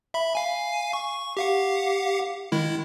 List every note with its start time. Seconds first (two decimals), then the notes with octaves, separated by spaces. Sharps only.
0.14 E5 B5
0.35 F5 G#5
0.93 C#6
1.37 G4 F5 F#5
2.52 D#3 G#3 E4